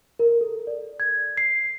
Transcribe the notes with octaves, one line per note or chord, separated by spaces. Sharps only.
A#4
A4
D5
G#6
C7